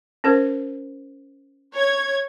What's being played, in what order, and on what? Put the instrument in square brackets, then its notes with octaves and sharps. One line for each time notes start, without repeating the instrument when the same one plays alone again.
[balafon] C#4 A#4 C5
[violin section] C#5 G#6